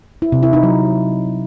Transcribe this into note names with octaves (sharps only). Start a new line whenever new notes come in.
E4
C3
E4
D#4
F#3